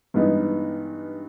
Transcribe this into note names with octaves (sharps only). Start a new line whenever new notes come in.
G2 E3 G#3 B3 D#4